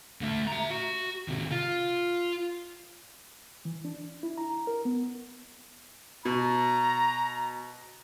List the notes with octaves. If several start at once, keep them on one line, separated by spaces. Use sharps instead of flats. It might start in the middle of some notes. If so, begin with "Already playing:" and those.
D3 A3
E5 A#5
F#4
C3 D#3
F4
E3
D4
E4
A#5
A#4
B3
B2 A#5